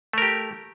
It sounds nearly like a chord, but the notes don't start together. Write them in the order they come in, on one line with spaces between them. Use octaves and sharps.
A3 A#4 G4